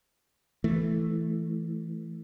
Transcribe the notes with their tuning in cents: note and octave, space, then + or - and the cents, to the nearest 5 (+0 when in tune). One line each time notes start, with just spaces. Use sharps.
E3 +5 A3 +0